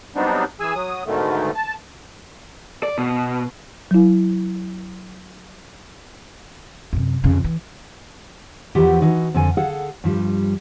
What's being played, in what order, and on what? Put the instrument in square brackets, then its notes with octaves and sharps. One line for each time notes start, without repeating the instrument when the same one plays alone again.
[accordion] F#3 G3 B3 C4 D4 D#4
E3 G#4 G#5 E6
F#3 D#6
G#2 B2 D3 D#3 A3
A5
[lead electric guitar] D5
B2
[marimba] F#3 E4
[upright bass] F#2 C3
F2 C#3
E3
[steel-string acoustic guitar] E2 E3 F3 F#4 G4 E5
E3 D#4 F#4
F2 D3 A4 G#5
G#4 A4 F5 F#5
G2 F3 G3